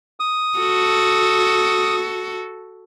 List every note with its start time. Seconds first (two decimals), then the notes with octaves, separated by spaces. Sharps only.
0.20 D#6
0.59 F#4 A4